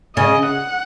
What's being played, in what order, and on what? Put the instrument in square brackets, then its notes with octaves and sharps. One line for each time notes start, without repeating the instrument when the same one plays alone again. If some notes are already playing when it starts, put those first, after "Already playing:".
[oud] C#3 [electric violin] D#5
[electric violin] F#5